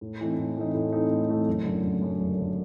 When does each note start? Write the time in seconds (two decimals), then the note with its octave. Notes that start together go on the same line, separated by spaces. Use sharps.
0.01 A2
0.21 E3 A3 C4 D#4
0.38 A2
0.57 E3 A3 C4 D#4
0.75 A2
0.93 E3 A3 C4 D#4
1.11 A2
1.29 E3 A3 C4 D#4
1.47 F#1
1.65 F#2 D3
1.83 F#1
2.02 F#2 D3
2.20 F#1
2.38 F#2 D3